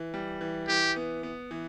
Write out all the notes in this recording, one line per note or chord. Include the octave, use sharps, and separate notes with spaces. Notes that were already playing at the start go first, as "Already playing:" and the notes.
Already playing: E3
G3
E3
E3 G4
B3
B3
E3